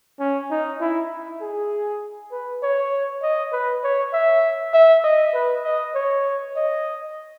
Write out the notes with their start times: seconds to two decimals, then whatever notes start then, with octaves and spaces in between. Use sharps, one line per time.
0.20 C#4
0.51 D#4
0.81 E4
1.41 G#4
2.32 B4
2.63 C#5
3.22 D#5
3.52 B4
3.83 C#5
4.13 E5
4.74 E5
5.04 D#5
5.34 B4
5.64 D#5
5.95 C#5
6.56 D#5